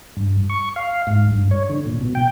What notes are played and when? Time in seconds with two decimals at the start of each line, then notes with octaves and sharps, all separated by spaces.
0.17 G2
0.50 C#6
0.76 F5
1.07 G#2
1.31 G2
1.51 C#5
1.69 D3
1.86 A#2
2.01 B2
2.15 G5